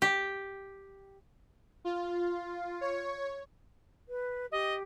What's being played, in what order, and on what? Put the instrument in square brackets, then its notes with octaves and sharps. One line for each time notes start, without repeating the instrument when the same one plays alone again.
[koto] G4
[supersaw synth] F4
C#5
[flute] B4
[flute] G4 [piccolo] D#5